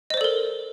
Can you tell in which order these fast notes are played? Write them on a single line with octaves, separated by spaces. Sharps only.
D#5 C5 D5 A4 A#4